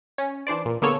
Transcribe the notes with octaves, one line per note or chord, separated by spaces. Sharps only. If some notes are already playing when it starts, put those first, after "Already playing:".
C#4
E3 D4 C5 D5
A#2
D3 A#3 B3 G#4 A4 C#5